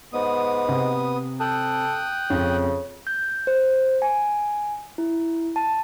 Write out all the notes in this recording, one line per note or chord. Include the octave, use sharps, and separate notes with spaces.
G#2 B3 D#6
C3
A4 G5 D#6 F#6
F2 C#3
G6
C5
G#5
E4
A5